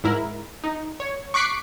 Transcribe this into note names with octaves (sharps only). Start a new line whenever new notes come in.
G#2 E4 A#4
D#4
C#5
C#6 D6 F#6 B6 C7 D7